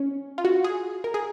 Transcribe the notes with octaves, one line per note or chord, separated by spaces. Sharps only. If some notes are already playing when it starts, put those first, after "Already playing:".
Already playing: C#4
F4
F#4
G#4
A#4
G#4